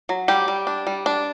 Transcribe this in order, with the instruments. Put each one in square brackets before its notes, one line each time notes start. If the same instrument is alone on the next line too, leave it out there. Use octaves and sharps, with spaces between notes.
[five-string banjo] F#3
G3 G4
G3
D4
G3
D4